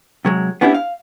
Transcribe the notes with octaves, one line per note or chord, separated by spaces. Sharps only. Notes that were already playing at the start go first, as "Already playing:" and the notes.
C3 F#3 G#3
B3 C#4 D4 E4 F4 G4
F5